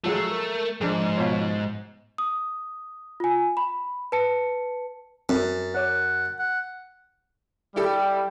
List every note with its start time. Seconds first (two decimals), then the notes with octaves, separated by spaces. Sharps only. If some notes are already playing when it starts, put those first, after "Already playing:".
0.04 F3 F#3 G#3 A3 C7
0.31 A#4
0.81 G#2 F3 D4 G#4
1.18 B2 F4 C#5
2.18 D#6
3.20 F4 G#5
3.57 B5
4.12 B4 A5 C#7
5.29 F#2 C4 A4
5.75 A#4 C#5 F#5 D6
6.39 F#5
7.76 G3 E4 G4 A4